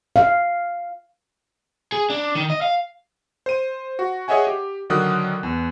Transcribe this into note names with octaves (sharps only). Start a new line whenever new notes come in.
F5
G#4
D4
D#3
D#5
F5
C5 D#7
F#4
G#4 C#5 D#5 E5 F#5 G#5
G4
D3 D#3 F#3 A#4 D#6 F#6
E2